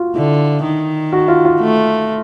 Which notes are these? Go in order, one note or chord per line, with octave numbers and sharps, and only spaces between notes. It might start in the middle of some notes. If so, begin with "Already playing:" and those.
Already playing: F4 F#4
D3 E4
D#3
F#4
F4
F4
A3